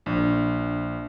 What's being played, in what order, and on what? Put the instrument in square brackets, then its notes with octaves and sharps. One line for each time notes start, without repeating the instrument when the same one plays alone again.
[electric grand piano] A#1 [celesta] D4